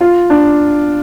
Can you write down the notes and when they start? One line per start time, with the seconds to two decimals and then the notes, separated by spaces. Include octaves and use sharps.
0.01 F4
0.30 D4